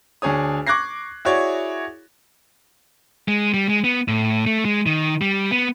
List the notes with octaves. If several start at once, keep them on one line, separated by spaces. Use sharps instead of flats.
D2 D4 G#4 C#5 D#6
C#6 D6 F#6 G#6 A#6 C7
E4 F#4 G#4 C#5 D5
G#3
G3
G#3
B3
A2
A3
G#3
D#3
G3
B3